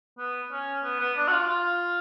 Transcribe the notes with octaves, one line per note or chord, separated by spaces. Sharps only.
B3
C#4
B3
B3
D4
F#4
F4
F4